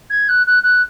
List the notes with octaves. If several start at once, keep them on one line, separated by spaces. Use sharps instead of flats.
G#6
F#6
F#6
F#6